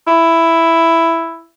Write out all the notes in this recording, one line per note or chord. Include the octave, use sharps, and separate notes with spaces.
E4